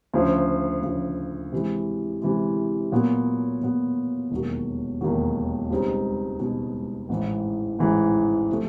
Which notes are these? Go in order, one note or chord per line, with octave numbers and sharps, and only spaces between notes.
D2 C#3 F3
D2 C#3 F3
C3 E3 G#3
C3 E3 G#3
A#2 F#3 B3
A#2 F#3 B3
E1 D#2 D#3 F#3
E1 D#2 D#3 F#3
C#2 B2 G3 C4 D#4
C#2 B2 G3 C4 D#4
A1 G#2 E3 G#3
A1 G#2 E3 G#3
C3 F3 A3